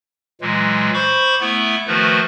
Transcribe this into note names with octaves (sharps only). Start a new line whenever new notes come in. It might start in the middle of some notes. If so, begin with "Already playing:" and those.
A#2 E3 F#3 G#3
C5 B5 C#6 D6
A3 B3 E4 E5
D#3 F3 A3 F#4 B4